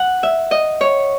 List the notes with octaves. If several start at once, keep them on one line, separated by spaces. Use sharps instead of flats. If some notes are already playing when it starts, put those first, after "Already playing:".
Already playing: F#5
E5
D#5
C#5